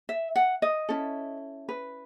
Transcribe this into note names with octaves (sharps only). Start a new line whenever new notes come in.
E5
F#5
D#5
C#4 E4 A4
B4